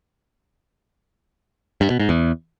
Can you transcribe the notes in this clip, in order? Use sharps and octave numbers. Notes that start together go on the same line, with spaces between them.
G2
B2
G#2
E2